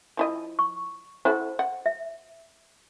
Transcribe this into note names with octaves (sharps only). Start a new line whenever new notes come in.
F3 E4 D#5
C#6
E4 F#4 A4 C5
F#5
E5